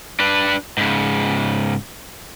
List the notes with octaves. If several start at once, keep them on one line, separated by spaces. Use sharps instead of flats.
D4 B4
G#2 C#3